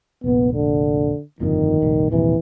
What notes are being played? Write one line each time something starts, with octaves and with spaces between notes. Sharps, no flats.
F1 A#1 B3
D3
G1 F2 A#2 D#3
F1 A#1 G3
D#1 A#1 C3 E3